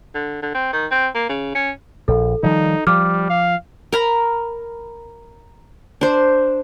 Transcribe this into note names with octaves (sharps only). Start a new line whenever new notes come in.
D3
D3
C4
D#3
C4
A#3
C#3
C#4
A#1 A4
D#3 F3 G3 D#4
F3 G3 D6 F6
F5
A#4 A#5 B5
D4 C5